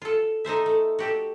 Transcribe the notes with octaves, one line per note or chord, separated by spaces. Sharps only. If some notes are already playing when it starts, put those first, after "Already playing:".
F4 A4
D#4 A4 C5 E5
A3
F#4 G4 A4